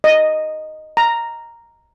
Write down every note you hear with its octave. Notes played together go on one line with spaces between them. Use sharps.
D#5
A#5